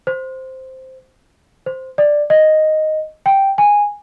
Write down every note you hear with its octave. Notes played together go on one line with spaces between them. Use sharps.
C5
C5
D5
D#5
G5
G#5